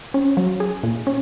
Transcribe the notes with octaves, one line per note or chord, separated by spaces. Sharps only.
C#4
F#3
G#4
A#2
C#4